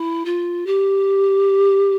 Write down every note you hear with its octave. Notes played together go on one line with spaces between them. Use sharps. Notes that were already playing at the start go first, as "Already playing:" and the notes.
Already playing: E4
F4
G4